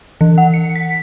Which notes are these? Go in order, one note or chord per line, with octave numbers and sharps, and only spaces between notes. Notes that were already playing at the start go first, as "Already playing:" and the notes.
E3
F#5
C#7
B6